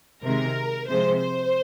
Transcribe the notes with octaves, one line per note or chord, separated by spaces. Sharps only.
C3 D#3 G#3 A#4
C3 F3 G#3 C5
C5